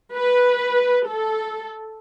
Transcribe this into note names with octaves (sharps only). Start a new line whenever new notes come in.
B4
A4